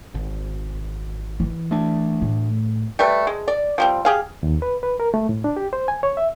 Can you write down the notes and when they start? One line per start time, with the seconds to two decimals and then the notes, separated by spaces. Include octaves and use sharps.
0.14 G#1
1.40 E3
1.71 A3 D4
2.22 A2
2.99 G3 A3 B4
3.27 G#3
3.48 D5
3.78 F3 G3 C4
4.05 G4 G#4 F5
4.43 D#2
4.62 B4
4.83 B4
5.00 A#4
5.14 A3
5.29 A2
5.44 D4
5.57 G4
5.73 C5
5.88 G#5
6.03 C#5
6.17 E5